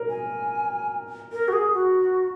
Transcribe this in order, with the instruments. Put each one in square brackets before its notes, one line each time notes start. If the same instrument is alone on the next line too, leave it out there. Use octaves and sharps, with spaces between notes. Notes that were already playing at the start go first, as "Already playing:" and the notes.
Already playing: [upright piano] A#4
[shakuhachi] G#5
A#4
F#4
G#4
F#4